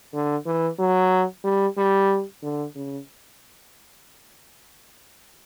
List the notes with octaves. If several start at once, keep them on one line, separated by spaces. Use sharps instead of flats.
D3
E3
F#3
G3
G3
D3
C#3